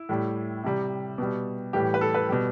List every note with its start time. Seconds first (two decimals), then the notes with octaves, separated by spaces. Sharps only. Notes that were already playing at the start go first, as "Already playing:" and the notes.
Already playing: E4
0.09 A2 G3
0.64 C3 G3
1.18 B2 G3
1.73 A2 E3 G3 G4
1.94 B4
2.01 A4
2.15 B4
2.29 B2 G3